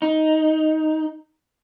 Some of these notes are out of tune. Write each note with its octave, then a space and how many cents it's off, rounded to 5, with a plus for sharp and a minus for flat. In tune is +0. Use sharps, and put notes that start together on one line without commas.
D#4 +10